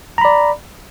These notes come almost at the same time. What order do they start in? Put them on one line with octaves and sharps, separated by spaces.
A#5 B5 D5